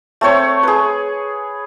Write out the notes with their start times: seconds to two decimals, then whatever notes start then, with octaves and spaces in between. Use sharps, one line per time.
0.21 A3 C4 C#5
0.63 G#4 B4